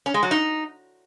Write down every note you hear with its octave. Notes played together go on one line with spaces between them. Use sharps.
C#4
G#3
F#3
D#4